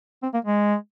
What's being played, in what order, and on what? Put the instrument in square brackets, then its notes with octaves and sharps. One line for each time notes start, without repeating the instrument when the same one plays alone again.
[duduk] C4
A#3
G#3